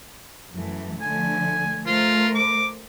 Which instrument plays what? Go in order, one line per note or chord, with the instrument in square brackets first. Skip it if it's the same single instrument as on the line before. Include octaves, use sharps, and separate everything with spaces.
[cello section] F#2 E3 A3
[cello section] D3 F3 A3 [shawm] G#5
[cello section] A3 A#4 C5 [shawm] F4
[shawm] D6